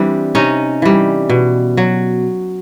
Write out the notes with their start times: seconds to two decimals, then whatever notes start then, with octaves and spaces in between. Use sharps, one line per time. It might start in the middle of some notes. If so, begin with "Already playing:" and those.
Already playing: E3 G3 C4 D4
0.35 C3 C#4 D#4
0.82 E3 G3
1.29 B2
1.77 F#3